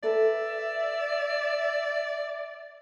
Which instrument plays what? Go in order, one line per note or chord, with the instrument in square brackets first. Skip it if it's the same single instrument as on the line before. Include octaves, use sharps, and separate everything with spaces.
[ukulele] A4 B4 [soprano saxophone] D5 [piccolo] E5